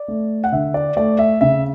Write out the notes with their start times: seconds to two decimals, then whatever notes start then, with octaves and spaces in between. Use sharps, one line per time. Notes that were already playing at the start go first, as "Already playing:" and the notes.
Already playing: D5
0.08 A3
0.44 F#5
0.52 D3 E5
0.74 D5
0.96 A3 D5
1.19 E5
1.41 C#3 E5